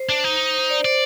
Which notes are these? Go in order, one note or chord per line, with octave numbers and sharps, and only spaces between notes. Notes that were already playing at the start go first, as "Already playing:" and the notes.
Already playing: C5
D4
D#4
C5
D5
C5 D5